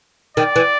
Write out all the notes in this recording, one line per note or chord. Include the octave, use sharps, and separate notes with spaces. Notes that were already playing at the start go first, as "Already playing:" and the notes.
D#3 D5
E3